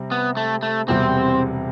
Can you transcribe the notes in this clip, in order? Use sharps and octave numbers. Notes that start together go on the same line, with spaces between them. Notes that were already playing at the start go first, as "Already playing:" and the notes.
Already playing: C3 G3 C4
B3
A3
A3
E1 E2 C3 G3 C4